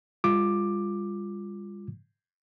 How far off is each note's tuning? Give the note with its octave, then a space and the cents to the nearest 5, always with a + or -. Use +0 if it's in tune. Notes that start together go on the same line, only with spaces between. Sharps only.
G3 +45 F4 +0 D6 +10